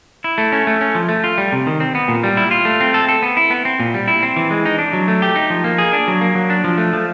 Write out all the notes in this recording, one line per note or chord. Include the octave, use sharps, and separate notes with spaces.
E4
A3
C#4
A3
C#4
F3
A3
F4
G3
C3
D#3
C4
B3
A#2
G3
E4
F4
A3
C4
A4
A4
B3
E4
B3
C4
A#2
G3
E4
C4
E3
G#3
D#4
D4
F#3
A3
G4
D#4
F3
A#3
G#4
D4
F#3
A#3
F#3
D4
F3
A3
F3